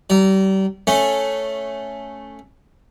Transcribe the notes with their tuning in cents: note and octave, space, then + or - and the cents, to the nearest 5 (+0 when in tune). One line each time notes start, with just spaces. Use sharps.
G3 -30 A#5 +0
A3 +0 C#4 +0